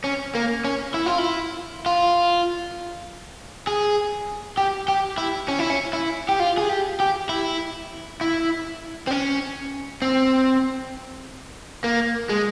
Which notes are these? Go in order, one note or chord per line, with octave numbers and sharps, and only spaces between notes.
C#4
A#3
C#4
E4
F4
E4
F4
G#4
G4
G4
E4
C#4
E4
C#4
E4
G4
F4
G#4
G4
G4
E4
E4
C4
C#4
C4
A#3
G#3